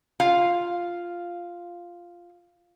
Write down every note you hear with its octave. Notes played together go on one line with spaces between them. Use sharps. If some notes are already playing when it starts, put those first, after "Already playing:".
F4 F5